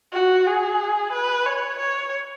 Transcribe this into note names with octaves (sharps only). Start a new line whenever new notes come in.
F#4
G#4
B4
C#5
C#5